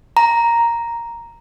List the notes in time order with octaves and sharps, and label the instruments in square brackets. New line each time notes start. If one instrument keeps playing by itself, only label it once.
[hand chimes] A#5